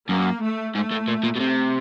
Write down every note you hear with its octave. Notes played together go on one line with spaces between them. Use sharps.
F#2 A#3
A3
G#2 A3
A2
A#2
A#2
B2
C3